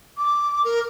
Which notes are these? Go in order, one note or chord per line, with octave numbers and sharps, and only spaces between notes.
D6
A#4